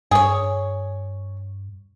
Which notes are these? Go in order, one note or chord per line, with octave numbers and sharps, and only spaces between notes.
G2 G#4 C#5